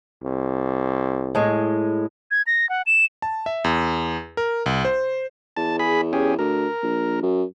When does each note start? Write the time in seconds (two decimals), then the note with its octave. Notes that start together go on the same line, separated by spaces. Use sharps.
0.24 C2
1.35 A2 G#3
2.31 G#6
2.47 A#6
2.69 F#5
2.86 E7
3.22 A5
3.46 E5
3.64 E2
4.37 A#4
4.66 C2
4.85 C5
5.57 E2 A5
5.79 G#4 B5
6.13 C#4 G4 G#4
6.39 D2 A#4
6.83 A#1
7.22 F#2